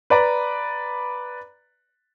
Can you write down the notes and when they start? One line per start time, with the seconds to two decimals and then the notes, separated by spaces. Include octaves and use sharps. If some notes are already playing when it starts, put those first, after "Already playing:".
0.10 B4 D5 A#5 B5